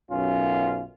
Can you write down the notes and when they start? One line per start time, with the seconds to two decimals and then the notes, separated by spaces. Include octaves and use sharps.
0.11 B1 F#2 C#4 F4